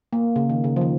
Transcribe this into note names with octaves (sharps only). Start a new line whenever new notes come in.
A#3
C#3
D#3
C#3
F3
D#3